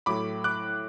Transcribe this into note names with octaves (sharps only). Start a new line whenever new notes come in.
A2 F#3 A3 B5 D6
D6 F#6